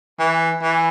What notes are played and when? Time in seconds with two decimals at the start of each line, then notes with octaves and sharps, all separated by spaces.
0.19 E3
0.63 E3